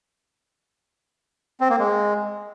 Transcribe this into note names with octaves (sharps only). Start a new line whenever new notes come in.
C4
A#3
G#3